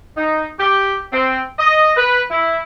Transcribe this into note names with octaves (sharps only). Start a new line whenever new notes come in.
D#4
G4
C4
D#5
B4
E4